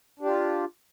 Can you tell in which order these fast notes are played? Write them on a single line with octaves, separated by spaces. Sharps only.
D4 G4 F4